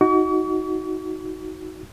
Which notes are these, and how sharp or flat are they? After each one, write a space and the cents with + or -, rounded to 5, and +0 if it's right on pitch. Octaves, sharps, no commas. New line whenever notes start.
D#4 +25 F#4 +0 C#6 +45